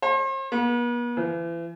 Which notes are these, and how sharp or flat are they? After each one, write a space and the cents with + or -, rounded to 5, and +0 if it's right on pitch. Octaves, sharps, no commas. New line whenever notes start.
C5 +40
B3 -45
E3 +35